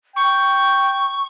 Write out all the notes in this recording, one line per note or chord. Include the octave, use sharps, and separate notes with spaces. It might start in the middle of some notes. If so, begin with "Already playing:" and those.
G5 C#6